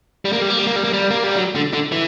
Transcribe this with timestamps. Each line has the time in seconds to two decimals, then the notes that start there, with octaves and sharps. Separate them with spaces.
0.25 G3
0.33 A#3
0.42 G3
0.50 A#3
0.59 G3
0.67 A#3
0.76 G3
0.84 A#3
0.93 G3
1.11 A#3
1.24 G3
1.37 F#3
1.55 D3
1.73 D3
1.92 E3